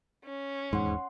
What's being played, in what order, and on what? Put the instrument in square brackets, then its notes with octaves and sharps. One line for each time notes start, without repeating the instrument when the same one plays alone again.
[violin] C#4
[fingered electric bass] D#1 E2 [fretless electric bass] G#2 [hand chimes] F#5 C6